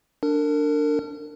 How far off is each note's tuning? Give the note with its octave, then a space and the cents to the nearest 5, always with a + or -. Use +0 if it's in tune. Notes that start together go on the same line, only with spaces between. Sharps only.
D4 +0 A#4 -35